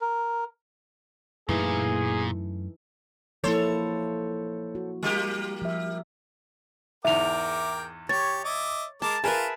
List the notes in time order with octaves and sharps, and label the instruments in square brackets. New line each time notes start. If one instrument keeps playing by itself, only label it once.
[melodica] A#4
[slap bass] F#2 A3 [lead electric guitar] A#2 [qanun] E3 D#4 A4 [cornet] G#4
[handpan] F3 A#3 E4 [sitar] A4 C5 C#5
[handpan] F#4
[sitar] G3 A#3 G4
[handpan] F3 E5
[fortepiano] E2 G#2 [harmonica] A#4 G5 D6 [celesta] E5 F7
[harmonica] G4 [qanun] C#5 [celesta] A6
[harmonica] D#5 E5 D6
[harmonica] G#3 A#4 D6 [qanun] A5
[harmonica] F4 [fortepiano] G#4 A#4 B4 [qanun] E5 A5